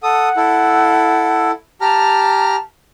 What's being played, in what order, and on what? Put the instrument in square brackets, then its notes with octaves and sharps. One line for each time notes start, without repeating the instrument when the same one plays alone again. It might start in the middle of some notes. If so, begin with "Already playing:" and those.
[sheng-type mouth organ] A4 D#6 [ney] F#5
[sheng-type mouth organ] E4 A4
[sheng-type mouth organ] G4 A#5 F6 [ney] A5